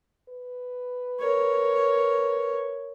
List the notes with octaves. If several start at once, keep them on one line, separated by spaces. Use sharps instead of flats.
B4
A#4 C#5